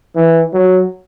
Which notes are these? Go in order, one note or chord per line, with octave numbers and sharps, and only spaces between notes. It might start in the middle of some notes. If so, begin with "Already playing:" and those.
E3
F#3